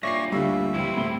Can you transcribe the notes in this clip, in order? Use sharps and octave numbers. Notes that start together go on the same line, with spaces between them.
G2 A#2 C#5 D5 E5 C#6 A#6 C7
D2 D3 G3 E5 F5 C#6
D#2 A#2 E3 G3 C4 E4
D1 A2 G7